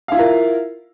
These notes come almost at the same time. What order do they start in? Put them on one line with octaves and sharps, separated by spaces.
F5 E4 F4 A#4